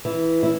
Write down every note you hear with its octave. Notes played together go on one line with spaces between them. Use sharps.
E3
E4